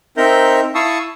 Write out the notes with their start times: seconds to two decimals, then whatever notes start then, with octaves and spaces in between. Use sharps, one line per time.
0.17 C4 D#4 A#4 E5 A#5 G6
0.75 E4 F5 A5 C#6 D#6 E6